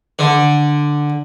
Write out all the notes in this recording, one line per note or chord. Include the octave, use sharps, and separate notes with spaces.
D3